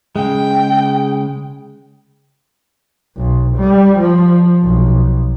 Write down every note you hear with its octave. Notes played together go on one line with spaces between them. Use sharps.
C#3 G#3 G5
B1
G3
F3
B1